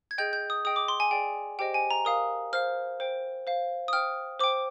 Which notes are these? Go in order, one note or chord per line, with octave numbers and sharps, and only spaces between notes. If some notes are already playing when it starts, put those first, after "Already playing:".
G#6
G#4 D#5 G5 G6
G6
D#6
G#4 D#5 G5 D#6
D6
C6
G#5
G#4 D5 G5
G4 C5 D#5 G5
G#5
A#5
A#4 F5 D#6
C5 F5 F6
C5 G5
C5 F5
D#6
C5 G5 F6
C5 G5 D6